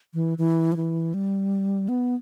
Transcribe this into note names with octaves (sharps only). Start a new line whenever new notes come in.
E3
E3
F3
E3
G3
B3